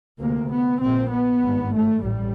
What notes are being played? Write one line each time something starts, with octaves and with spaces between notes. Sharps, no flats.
D2 C3 A#3
B3
A#1 A#2 C4
B3
G#1 G2
A3
A1 G3